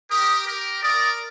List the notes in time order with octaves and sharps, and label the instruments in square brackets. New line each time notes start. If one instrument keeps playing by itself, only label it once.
[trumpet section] G4 A#4 [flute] D#6
[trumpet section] G4 A#4
[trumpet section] A#4 D5 [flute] D#6